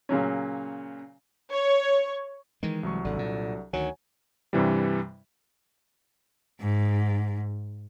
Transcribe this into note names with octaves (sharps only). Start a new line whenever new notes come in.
A#2 C#3 F#3 C#4
C#5
D#3 E3 G#3
C2 F#3 C#6
G#1 D3
A#2
D2 D#3 F#3 G#5
G2 C3 E3 G3
G#2